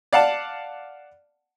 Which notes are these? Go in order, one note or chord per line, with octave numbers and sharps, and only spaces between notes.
D5 F5 F#5 A5